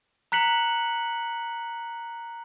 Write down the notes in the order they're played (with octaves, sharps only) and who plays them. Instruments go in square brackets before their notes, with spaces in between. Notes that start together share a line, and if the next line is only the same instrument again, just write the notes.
[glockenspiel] A#5 F#6 B6 C#7 F#7